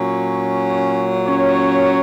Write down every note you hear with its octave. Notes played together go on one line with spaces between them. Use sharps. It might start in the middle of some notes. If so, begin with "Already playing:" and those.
Already playing: A#2 F#3 C#4
C#4 C#5